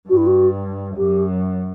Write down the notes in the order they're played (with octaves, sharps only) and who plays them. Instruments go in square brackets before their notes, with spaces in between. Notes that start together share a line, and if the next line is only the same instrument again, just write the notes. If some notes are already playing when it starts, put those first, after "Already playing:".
[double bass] G2 [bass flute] F#4
[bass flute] E4
F#4
[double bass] F#2 [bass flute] G4